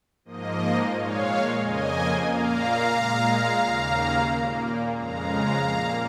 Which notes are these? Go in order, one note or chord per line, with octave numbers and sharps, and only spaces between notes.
G#2 F3 A#3 D#5
A#2 G#3 C#5 F5
F2 C#3 A#3 D#5 G#5
A#2 A#3 F5 A#5
A#2 G#3
D#2 C#3 A#3
A#2 A#3
F2 C#3 G#3 F5 A#5
A#2 A#3